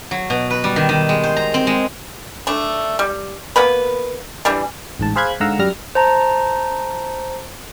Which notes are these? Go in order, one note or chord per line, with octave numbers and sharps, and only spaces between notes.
F#3
B2
B4
G3
D#3
D#3
G#3
C5
A#5
C4
G#3
A3 D4
G3
A#3 B3 B4
E3 G3 D4
A1 G#2 A5
G#4 C5 F5 B5 F#6 G#6
G#2 D3 F5 F#5 A#5 E6
F#2 G3 F6 A#6
C5 A5 A#5